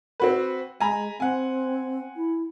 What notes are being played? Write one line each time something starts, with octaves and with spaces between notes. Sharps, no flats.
C4 F#4 B4
G#3 G#5 A#5 B5
C4 F#5 G#5
E4